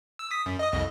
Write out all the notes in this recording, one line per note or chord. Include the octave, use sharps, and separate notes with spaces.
E6
D#6 B6
F#2
D#5 D#6
C2 F2 D#5